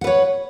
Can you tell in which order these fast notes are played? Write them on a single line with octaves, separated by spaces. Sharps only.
F#5 B4 C#5